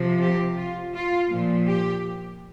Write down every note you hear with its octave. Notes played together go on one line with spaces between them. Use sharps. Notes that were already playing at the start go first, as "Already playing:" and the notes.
Already playing: C3 F3
G4
F4
F4
A#2 F3
G4